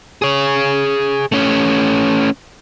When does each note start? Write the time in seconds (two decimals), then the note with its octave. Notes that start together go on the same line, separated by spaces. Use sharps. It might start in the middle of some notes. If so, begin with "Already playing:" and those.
0.22 G#4 C#5
1.32 A3 C#4